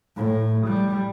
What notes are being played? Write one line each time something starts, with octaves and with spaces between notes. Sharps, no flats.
A2
G3